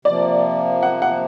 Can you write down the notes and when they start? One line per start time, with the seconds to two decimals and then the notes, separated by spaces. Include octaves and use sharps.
0.05 C3 F3 A#3 D5
0.83 F#5
1.02 F#5